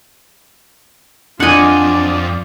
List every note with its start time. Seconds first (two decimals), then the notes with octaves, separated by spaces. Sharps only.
1.40 F2 D4 F4 D5 D#5 F#5 G#5